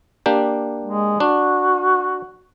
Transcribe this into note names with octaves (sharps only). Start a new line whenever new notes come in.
A#3 D4 G4
G#3
D4 F#4